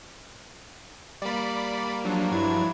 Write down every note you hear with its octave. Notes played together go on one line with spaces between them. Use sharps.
G3 A#3 D5 B5
F3 F#3 D4
G2 E4 G#6